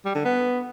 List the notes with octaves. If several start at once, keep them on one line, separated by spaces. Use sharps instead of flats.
G3
D3
B3